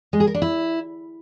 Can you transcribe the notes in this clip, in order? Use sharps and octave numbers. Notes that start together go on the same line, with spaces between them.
G#3
G#4
A#4
D4
E4